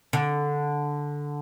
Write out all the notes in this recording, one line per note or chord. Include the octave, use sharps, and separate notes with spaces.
D3